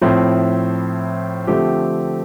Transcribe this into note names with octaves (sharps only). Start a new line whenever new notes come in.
A2 F3 C4 E4
D3 F3 A3 C4 G4